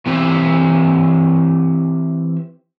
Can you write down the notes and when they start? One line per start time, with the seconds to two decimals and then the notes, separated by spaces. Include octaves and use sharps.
0.06 E3 C4 G4 E5